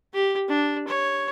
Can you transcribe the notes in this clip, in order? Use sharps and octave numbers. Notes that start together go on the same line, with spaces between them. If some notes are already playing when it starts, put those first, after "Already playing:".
G4
D4
C#5